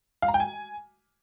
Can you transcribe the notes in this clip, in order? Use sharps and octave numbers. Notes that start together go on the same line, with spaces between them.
F5
A#5
G5
G#5